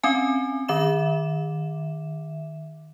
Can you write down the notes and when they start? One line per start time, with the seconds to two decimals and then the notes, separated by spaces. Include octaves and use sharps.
0.03 C4 C#4 G#5
0.68 D#3 E5 D6 E7